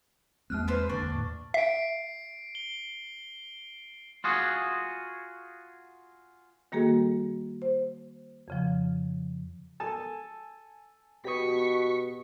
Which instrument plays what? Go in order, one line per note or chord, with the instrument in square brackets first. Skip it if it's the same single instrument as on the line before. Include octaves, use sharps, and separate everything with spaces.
[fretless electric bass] E2 G#3 C4 [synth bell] A#3 F6 F#6
[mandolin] B4 C5 C6
[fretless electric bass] E2 D3 [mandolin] D4 [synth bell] C#6
[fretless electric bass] D#2 A2
[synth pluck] E5 [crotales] C7 D7
[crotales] G7
[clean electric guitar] F4 F#4 G#4
[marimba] D#3 G3 A#3 F#4 G#4 A4
C5
F2 C#3 F3
[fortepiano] A4 G#5 A5
[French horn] B2 [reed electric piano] G4 B4 D#6 [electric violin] C#6 B6